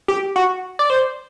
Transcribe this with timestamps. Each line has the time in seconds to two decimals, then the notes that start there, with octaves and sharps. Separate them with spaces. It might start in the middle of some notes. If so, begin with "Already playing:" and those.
0.08 G4
0.36 F#4
0.79 D5
0.90 C5